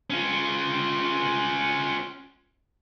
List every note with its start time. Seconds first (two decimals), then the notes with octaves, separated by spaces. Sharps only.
0.10 C#4 F4